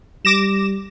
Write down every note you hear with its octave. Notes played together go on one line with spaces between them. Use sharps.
G3 D6 A#6 E7